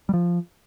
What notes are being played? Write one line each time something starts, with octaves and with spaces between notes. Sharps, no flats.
G3
F3